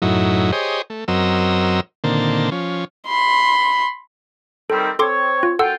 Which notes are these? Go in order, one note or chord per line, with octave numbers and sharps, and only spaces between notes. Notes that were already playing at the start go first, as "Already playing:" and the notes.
F#2 A2 F#3 D#4 E4
G4 G#4 C5 C#5 D#5
A3
F#2 F#3 C4 A#4 D#5 E6
A#2 D3 D#3 A#3 C4 A5
F3 C#4
B5 C6
D#3 G3 C4 A4
C4 A4 C#5 C6 D6
F4
F#2 F4 A4 F#5 G5 E6